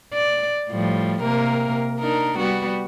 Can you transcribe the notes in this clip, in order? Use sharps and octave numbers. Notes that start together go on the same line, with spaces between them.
D5
A2 F3 G3
C3 A#3 A#4
D4 D#4 A#4
G3 B3 F#4